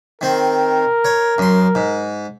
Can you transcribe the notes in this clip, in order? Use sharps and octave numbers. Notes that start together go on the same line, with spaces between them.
D#3 C4 A#4
C#5
F#2 C6
G#2